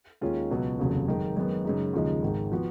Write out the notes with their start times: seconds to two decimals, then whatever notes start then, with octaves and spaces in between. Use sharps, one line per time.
0.21 D#2 D#3 G#3 C#4 F4
0.50 C#2 B2 F#3 B3
0.79 F1 D#2 C#3 F#3
1.07 F#2 D#3 G#3
1.36 F#2 D#3 G#3 B3
1.65 F#2 C#3 G#3 D#4
1.94 D#2 C#3 F3 G#3 D#4
2.22 G#1 G#2 D#3 G#3
2.52 F3 B3 F#4